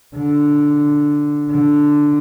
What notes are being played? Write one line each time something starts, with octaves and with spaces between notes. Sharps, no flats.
D3
D3